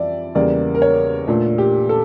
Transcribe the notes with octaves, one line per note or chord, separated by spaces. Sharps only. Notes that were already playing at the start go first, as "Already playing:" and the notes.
Already playing: F2 E3 G3 D5 E5
E2 C#3 G3 A#3 D5
A#4
C#5
A#2 A3 D4
G4
A4